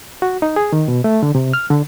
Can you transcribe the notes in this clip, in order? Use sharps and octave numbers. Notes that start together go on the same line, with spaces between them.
F#4
D#4
G#4
D#3
B2
A3
D3
C3
F6
D3